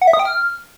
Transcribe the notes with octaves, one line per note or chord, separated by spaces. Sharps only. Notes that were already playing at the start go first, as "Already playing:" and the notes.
F#5
E5
D#6
G5
F6